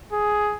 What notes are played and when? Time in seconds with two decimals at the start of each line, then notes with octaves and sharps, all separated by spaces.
0.12 G#4